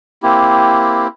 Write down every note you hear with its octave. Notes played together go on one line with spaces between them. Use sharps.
A#3 C4 E4 G4